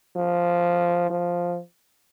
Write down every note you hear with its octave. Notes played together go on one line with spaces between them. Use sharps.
F3
F3